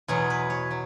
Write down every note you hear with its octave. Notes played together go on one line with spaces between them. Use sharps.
E2 B2 F#3 G#4
B4
C#5
F#3